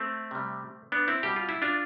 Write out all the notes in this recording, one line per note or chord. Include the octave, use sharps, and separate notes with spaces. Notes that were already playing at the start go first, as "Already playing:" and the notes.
Already playing: A3 C4
C3 G3
B3 D4
C4 E4
B2 G3 G4
F4
E4
D4 F4